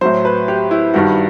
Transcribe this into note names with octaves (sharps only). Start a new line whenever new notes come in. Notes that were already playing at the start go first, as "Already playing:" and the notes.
A2 F#3 C5
B4
G4
E4
G2 D#3 G3 F#4